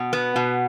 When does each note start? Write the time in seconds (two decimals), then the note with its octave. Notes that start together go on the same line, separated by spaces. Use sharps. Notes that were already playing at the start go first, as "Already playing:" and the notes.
Already playing: B2
0.13 B3
0.36 B2